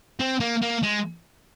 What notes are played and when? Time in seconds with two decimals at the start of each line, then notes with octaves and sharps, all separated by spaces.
0.20 C4
0.40 A#3
0.62 A#3
0.83 G#3